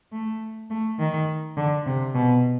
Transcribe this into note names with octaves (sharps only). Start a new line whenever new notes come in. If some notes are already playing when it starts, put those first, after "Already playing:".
A3
A3
D#3
D3
C3
B2